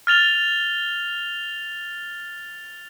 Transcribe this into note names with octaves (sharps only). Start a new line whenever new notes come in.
F6 A6 F7 G7